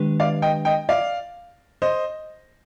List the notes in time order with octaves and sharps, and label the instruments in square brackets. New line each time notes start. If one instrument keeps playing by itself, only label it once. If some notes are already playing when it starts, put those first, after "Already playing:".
Already playing: [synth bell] D#3 G#3 D4 G4 B4
[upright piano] D5 F5
D#5 G5
D#5 G5
D5 F5
C5 D#5